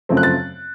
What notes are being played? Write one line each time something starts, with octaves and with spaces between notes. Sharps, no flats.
F#2 C#3 F3 A3 C4
F#6
A6